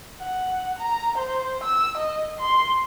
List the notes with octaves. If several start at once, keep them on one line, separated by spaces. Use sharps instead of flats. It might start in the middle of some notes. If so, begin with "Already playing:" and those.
F#5
A#5
C5
E6
D#5
C6